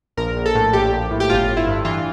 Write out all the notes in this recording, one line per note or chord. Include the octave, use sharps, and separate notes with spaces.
A#1 A#4
A#1
A4
A2
A#1 G4
A#1
A2
G4
G1 F4
G1
E4
G2
E3 F4